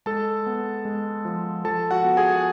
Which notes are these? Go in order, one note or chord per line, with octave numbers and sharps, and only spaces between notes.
G#3 A4 A5
B3
G#3
F3
F3 A4 A5
F#4 F#5
B3
G#4 G#5
F#5